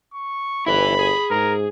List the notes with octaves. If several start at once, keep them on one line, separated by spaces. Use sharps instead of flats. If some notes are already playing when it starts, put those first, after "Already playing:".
C#6
G1 E4 B4 B5
G#4
G#2 A#4